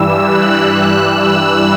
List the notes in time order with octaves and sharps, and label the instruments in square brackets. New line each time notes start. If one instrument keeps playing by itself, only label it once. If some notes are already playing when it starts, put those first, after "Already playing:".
Already playing: [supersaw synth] G2 E3 G3 E6
F#6
E6